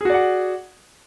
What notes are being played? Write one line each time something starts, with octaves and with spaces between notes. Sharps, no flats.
F#4 G#4 D5 F#5